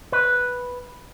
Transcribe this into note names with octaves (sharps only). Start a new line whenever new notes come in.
B4